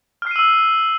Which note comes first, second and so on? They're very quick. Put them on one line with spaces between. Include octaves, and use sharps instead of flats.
F6 C7 D#7 E6